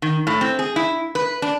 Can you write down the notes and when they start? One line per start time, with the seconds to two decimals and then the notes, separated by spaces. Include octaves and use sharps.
0.02 D#3
0.27 A2
0.41 C4
0.59 G#4
0.76 E4
1.15 B4
1.42 D4